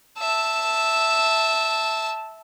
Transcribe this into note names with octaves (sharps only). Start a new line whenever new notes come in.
E5 A5